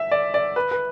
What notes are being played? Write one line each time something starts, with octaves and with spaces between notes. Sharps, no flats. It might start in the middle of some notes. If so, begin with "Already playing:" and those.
Already playing: E5
D5
D5
B4
B4